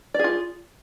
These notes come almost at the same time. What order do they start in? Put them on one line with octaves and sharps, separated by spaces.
D5 G#4 F4